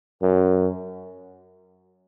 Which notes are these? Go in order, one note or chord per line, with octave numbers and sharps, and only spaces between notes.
F#2